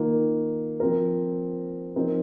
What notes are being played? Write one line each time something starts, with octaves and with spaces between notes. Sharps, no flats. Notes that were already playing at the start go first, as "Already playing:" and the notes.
Already playing: D#3 A#3 F4
F3 C4 F4 A#4
F3 C4 D#4 A#4